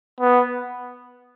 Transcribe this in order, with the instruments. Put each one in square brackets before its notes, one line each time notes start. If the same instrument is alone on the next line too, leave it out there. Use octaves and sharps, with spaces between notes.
[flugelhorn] B3